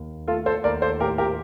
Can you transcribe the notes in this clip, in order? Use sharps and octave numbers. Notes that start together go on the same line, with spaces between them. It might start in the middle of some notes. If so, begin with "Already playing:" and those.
Already playing: D#2
A3 F4 A4
A4 C5
D#2 A#4 D5
A4 C5
A2 G4 A#4
G4 A#4